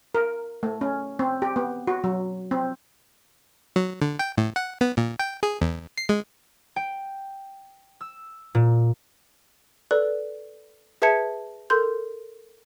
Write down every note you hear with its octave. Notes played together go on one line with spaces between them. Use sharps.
A#4
A3
C#4
C4
G4
B3
F#4
F#3
C4
F#3
D3
G5
A2
F#5
B3
A#2
G5
G#4
E2
C7
G#3
G5
E6
A#2
A4 B4 D5 F#6
G#4 B4 E5 A5 G#6 C#7
A4 A#4 C6 G6